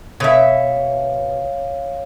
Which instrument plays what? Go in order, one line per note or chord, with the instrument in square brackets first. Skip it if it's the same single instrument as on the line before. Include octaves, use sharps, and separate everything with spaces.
[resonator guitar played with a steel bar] B2 E5 [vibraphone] C#5 F5